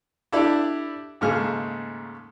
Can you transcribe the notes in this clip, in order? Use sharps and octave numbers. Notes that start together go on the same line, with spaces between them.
D4 E4 G4 A4 D5
D#2 G#2 C#3 A3 F6